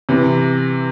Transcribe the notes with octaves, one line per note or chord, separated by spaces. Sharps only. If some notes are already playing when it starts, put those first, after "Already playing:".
C3 E3